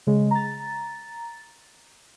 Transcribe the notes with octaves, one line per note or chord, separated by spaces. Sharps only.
C#3 G#3
A#5 A6